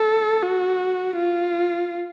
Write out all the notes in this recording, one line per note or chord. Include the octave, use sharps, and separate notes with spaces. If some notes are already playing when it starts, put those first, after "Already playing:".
Already playing: A4
F#4
F4